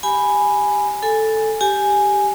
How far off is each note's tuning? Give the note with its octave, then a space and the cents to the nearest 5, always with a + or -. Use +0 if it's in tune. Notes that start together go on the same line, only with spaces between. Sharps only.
G4 +0 G#5 +0 B5 +0
A4 +0 G#5 -5
G4 +0 G#5 +0